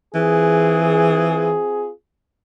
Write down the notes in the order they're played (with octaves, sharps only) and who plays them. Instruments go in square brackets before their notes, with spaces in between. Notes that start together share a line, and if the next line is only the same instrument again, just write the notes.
[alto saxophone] E3 [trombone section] C4 F4 G#4